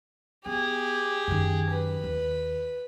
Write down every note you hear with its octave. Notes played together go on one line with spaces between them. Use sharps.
B3 G4 G#4
F#2 D#3
B4
D#2